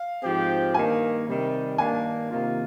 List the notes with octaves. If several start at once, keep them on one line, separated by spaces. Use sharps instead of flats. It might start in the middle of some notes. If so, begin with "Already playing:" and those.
Already playing: F5
G#2 F3 C4 G4
G2 D#3 A#3 G#5
C3 D#3 G3
G2 D#3 A#3 D4 G#5
C3 D#3 A#3 F4